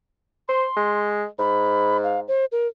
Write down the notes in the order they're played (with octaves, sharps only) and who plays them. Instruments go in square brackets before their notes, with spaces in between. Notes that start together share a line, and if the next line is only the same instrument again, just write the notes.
[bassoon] C5 [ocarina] C6
[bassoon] G#3
[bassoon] G#2 [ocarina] B5
[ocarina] F5
C5
A#4